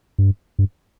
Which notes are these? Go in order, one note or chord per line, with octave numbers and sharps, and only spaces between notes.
G2
G2